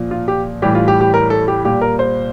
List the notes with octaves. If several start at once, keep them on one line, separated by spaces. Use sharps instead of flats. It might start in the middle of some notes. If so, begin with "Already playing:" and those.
Already playing: A#2 F3
F4
G4
A2 E3 G3 G4
F4
G4
G4
A#4
A4
G4
A#2 G3 G4
A#4
C5